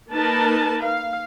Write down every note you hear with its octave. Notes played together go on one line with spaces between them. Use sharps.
A#3 D#4 A#4 B4 A5
F5